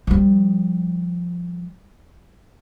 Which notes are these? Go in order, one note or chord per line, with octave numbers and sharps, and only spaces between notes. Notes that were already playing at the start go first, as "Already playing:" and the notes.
F3 G3